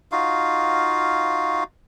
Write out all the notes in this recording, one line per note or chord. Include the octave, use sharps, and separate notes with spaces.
D#4 F4 F#4 F5